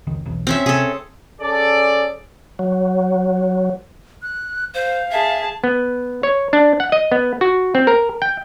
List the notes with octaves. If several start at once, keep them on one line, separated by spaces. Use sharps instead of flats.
F1 C#2 D#3
E1 B1 E2
C4 C#4 E5
C3 G#4 A4
C#4 G#4 A4 D5
F#3
F#6
C5 F5
G#4 E5 A5
B3
C#5
D4
F#5
D#5
B3
F#4
C4
A#4
G5